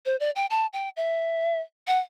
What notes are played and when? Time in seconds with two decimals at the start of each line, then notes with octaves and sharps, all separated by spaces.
0.06 C5
0.20 D5
0.36 G5
0.50 A5
0.73 G5
0.97 E5
1.87 F#5